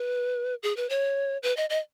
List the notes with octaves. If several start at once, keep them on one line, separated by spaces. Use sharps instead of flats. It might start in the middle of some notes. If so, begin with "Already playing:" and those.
Already playing: B4
G#4
B4
C#5
B4
D#5
D#5